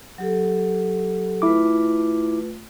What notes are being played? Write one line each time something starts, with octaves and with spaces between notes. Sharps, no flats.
F#3 G4 A4
A3 E4 F4 B4 D6